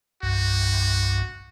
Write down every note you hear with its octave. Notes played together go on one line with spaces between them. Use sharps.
C2 G2 F#4